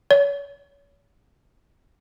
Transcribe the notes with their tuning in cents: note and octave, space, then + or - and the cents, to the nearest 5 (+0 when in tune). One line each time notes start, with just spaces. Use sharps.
C#5 +35